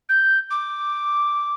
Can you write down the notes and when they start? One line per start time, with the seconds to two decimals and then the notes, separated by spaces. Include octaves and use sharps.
0.09 G6
0.50 D6